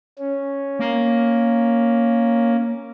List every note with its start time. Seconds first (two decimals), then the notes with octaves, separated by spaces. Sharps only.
0.19 C#4
0.79 A#3